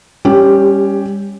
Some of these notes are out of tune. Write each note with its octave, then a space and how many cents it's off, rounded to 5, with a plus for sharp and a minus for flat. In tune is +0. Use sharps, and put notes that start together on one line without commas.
G3 +30 C#4 +0 G4 +0